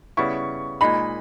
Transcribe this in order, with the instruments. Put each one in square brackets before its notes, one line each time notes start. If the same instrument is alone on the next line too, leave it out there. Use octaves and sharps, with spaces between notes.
[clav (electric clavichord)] C#3 G3 B3 E4 [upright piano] C#6
[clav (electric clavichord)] A#2 G#3 D#4 G#4 [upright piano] B5